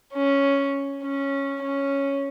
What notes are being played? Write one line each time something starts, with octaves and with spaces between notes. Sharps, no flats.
C#4
C#4
C#4